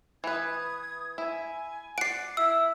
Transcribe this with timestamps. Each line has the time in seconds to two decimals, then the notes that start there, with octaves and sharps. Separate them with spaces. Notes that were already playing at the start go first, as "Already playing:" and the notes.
0.24 E3 B4 D#6 G#6
1.18 E4 G#5
1.98 D5 F#5 C7 D7
2.37 E4 E5 E6